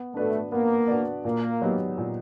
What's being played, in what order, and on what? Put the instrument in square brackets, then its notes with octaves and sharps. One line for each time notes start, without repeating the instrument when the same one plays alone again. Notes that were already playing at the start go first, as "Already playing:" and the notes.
Already playing: [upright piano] B3
[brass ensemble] A3 [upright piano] D4 F#4 B4 D5
[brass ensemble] A#3 [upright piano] B3
[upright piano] D4 F#4 B4 D5
[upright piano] A#2 [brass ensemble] A#3
[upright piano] F#3 B3 D#4 G4
A#2